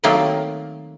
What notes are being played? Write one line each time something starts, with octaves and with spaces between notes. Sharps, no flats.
C3 D#3 F#3 A3 A#3